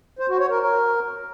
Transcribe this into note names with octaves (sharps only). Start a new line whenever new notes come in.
C5
F#4
C#5
A#4
A#4